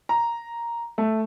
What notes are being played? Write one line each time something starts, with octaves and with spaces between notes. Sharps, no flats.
A#5
A3